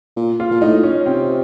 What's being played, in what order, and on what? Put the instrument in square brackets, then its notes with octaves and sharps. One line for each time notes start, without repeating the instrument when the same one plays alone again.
[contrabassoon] A#2
[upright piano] F4
[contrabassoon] A#2
[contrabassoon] A2 [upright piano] D#4
[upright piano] C#4
[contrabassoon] C3 [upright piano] C4